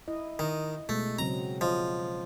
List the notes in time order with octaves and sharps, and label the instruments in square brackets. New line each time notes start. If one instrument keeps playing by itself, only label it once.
[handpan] E4 D#5
[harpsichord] D#3 [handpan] D#5
[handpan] B2 G#3 [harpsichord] A3
[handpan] C#3 F#3 C4 [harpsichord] A#5
[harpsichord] F3 [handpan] D#5